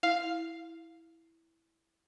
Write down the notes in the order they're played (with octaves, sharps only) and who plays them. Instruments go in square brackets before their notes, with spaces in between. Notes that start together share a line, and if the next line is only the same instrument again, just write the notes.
[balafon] E4 [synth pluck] F5